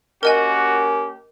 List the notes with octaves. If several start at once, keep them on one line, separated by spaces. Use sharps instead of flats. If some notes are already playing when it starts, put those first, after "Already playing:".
A#3 C#4 F#4 G4 A#4 D#5 G#5